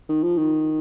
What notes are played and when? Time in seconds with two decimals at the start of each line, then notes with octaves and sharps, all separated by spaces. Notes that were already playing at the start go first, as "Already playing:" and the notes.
0.09 D#3
0.23 F3
0.38 D#3